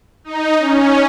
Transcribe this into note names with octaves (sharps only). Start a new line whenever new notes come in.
D#4
C#4